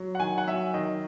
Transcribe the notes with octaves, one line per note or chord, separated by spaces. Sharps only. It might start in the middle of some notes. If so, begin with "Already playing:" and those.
Already playing: F#3
F#5
D#3 G#5
F#5
F#3 E5
D#3 D#5